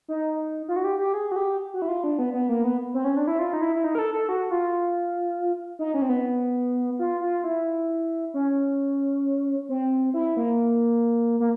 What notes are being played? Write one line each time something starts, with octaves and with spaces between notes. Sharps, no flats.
D#4
F4
F#4
G4
G4
G#4
F#4
G4
F#4
E4
F4
D4
B3
B3
A#3
B3
C4
C#4
D4
E4
F4
D#4
E4
E4
D#4
A#4
A4
A4
F#4
F4
D#4
C#4
C4
B3
F4
F4
E4
C#4
C4
E4
A#3
A#3